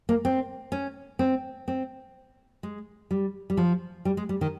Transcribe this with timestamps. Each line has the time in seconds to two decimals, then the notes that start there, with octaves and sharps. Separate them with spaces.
0.09 A#3
0.25 C4
0.72 C#4
1.19 C4
1.68 C4
2.63 G#3
3.11 G3
3.50 G3
3.57 F3
4.05 G3
4.17 G#3
4.29 G3
4.41 D#3